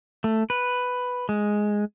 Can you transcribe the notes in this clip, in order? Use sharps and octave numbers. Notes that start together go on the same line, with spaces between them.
A3
B4
G#3